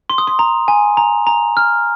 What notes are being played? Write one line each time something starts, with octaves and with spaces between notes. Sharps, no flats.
C6
D#6
C6
A#5
G#5
A#5
A#5
F6